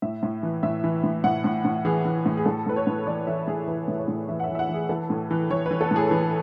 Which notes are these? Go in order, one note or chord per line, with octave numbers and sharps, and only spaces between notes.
A2 E5
A2
E3
A2 E5
E3
A2
A2 F#5
A2
A2
E3 G#4
E3
A2
G#4
A2 A4
A2 B4
C#5
A2
E3 D5
E3 E5
A2 G#4
E3 B4
A2
C#5
A2
E3 E5
F#5
E5
E3
E5
F#5
E3
G#4
E3 A4
A2
E3
E3 C#5
E3 B4
A4
A2 G#4
E3